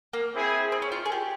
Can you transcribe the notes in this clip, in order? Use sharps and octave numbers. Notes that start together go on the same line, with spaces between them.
A#3
C4 E4 G#4
C4
C#4
F4
G#4
G4